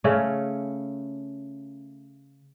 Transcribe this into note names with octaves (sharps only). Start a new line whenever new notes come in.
C#3 A3 C#4